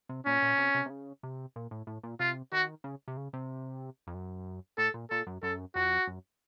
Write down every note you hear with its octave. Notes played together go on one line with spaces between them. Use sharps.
C3
A#2 C#4
A#2
C3
C3
C3
C#3
C3
A#2
A2
A2
A#2
C3 F4
D#3 F#4
C#3
C3
C#3
C3
F2
F#2
A2 A4
A#2
A#2 A4
F#2
F#2 A4
F2 F#4
F#2